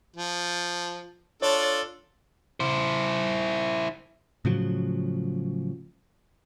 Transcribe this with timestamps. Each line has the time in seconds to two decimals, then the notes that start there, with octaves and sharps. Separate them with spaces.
0.16 F3
1.42 D4 F4 A4 C#5
2.60 E4 C5
4.45 A2 C#3 F3 F#3